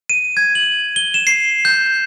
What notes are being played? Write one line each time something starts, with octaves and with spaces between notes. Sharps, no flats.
D#7
G#6
F#7
G7
E7
C7
G6